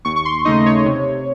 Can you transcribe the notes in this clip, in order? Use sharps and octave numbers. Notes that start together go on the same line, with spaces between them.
D#2 C#6
C#6
C6
C#3 A3 D#4 D#5
C#5
C3